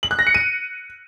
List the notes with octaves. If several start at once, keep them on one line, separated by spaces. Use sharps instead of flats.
F#7
F#6
A#6
C#7
D#7